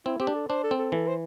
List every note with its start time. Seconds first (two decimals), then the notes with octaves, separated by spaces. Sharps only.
0.06 C4 E4
0.20 C4 G4
0.27 D4
0.35 A4
0.49 D4 C5
0.64 A4
0.71 C4
0.79 A4
0.92 E3 A4
1.07 C5